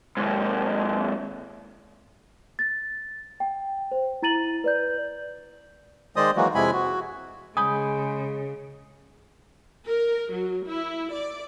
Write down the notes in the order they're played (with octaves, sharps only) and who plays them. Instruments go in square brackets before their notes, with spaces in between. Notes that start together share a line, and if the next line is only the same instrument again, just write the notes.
[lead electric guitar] D#2 G#2
[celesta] A6
G5
C5
E4 A#5 A6 D#7 F#7
B4 D5 G6
[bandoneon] D#3 G#3 C5 D5 D#5 D#6
E3 F#3 G#3 A#3 F#4
F2 C3 G#3 E4 G#5 B5
F#4
[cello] C#3 [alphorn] G#3 [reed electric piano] G#5 B5 G6 [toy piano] D#6
[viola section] A#4
F#3
E4
D5